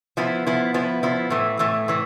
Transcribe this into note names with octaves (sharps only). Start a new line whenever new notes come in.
F3 B3 E4
F3 B3 E4
F3 B3 E4
F3 B3 E4
A2 E3 A3
A2 E3 A3
A2 E3